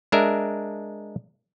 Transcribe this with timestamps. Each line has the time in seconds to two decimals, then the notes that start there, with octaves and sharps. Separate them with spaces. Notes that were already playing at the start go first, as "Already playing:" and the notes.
0.12 G#3 D4 A#4 E5